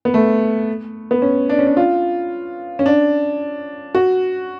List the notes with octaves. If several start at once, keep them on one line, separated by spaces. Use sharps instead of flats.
B3
A3
B3
C#4
D4
C#4
D4
F4
C#4
D4
F#4